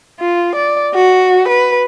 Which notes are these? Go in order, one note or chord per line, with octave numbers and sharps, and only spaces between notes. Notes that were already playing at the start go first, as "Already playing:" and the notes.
F4
D5
F#4
B4